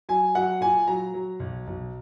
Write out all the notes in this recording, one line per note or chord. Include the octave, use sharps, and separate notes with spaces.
F#3 G#5
F#3 F#5
A#2 G#5
F#3 A#5
F#3
B1
B1